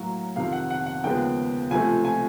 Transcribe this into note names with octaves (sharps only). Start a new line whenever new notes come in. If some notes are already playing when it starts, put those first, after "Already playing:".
Already playing: A2 F#3 A#3
F2 C3 D#3 F5
F#5
F#5
F#5
D#2 C#3 F3 G#3 B3 G5
C#2 C3 F3 A3 G#5
G#5